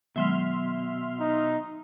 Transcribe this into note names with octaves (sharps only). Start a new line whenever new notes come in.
B2 D#3 F#3 G#3 E5 C6 F6
D#4